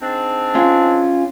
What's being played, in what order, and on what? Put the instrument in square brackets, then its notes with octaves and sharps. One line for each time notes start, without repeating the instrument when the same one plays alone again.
[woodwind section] G#2 C4 D4
[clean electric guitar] C#4 F4